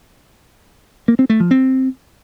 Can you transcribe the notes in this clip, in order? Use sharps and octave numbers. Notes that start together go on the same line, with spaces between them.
A#3
C4
A3
F3
C4